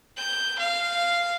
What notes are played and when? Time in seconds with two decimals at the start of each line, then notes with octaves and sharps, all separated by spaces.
0.18 G6
0.59 F5